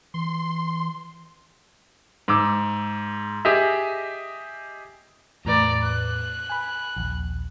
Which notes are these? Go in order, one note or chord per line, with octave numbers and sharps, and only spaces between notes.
E3 C6
G#2 D6 E6
G4 G#4 D#5 E5
E2 A2 B4 D5 A#5
F#6
G#5 B5
A#1 D#2